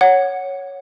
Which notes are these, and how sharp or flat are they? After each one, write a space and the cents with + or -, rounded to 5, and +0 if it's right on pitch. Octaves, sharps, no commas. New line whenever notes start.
C#5 +0 F#5 +0